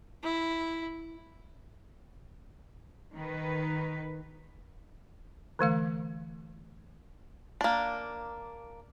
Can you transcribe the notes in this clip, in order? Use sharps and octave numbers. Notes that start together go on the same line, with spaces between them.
E4
D#3 B4
D3 E3 A3 F5
A#3 D4